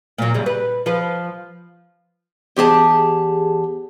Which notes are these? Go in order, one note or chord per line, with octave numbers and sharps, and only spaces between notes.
A#2 F#3
F#2 C#3 G3
B4
F3 B4
E2 G4 G#4 A5